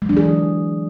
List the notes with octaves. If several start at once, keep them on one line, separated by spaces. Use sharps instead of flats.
E3 F#3 G#3 D4 G#4